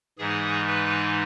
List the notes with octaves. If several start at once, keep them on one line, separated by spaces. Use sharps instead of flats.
G#2 E3 G#3 D#4 G#4
B4